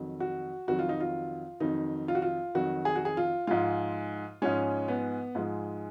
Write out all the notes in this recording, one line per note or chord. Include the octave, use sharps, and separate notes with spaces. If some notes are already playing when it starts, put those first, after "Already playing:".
Already playing: F2 D#3 F#3
F#4
F2 D#3 F#3 F#4
F4
D#4
F4
F2 D#3 F#3 D#4
F4
F#4
F4
F2 D#3 F#3 F#4
G#4
F#4
G#4
F4
G#2 F3 G#3 F4
G#2 F3 G#3 C#4
B3
G#2 F3 G#3